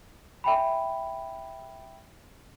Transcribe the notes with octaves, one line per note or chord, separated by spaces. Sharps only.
E5 G5 G#5 B5